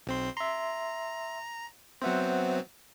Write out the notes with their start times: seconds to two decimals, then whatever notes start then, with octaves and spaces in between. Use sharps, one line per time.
0.07 B1 C4 C6
0.37 E5 A#5 C6
2.02 F#3 B3 C4 C5 E5 F#5